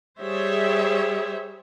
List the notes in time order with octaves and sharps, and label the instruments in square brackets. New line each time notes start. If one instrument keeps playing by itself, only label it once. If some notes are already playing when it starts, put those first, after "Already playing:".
[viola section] G3 G#4 C5 C#5 E5